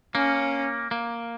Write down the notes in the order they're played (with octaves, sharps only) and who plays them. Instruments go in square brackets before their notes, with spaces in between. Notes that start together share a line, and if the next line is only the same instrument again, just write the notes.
[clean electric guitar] A#3 [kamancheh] C#4
[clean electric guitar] A#3